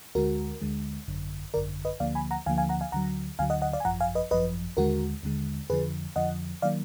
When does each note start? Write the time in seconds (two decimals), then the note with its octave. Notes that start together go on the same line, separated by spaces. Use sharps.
0.15 D2 D3 G#3 F#4 A#4
0.62 D2 D3 G#3
1.08 G#1 F#2 D3
1.54 G#1 F#2 D3 A#4 D5
1.85 B4 D#5
2.00 D2 D3 F3 A#3 D5 F5
2.15 G#5 B5
2.31 F#5 A#5
2.46 D2 D3 F3 A#3 F5 G#5
2.58 F5 G#5
2.69 F#5 A#5
2.81 F5 G#5
2.92 D2 D3 F#3 F#5 A#5
3.39 D2 D3 F#3 F5 G#5
3.50 D#5 F#5
3.62 D#5 F#5
3.73 D5 F5
3.80 G#5
3.85 G#1 F#2 F3 F#5 A#5
4.00 F5 G#5
4.15 B4 D#5
4.31 G#1 F#2 F3 B4 D#5
4.77 D#2 D3 G#3 F#4 A#4
5.23 D#2 D3 G#3
5.70 F2 D3 F3 G#4 B4
6.16 F2 D3 F3 D#5 F#5
6.62 D#3 F#3 A#3 D5 F5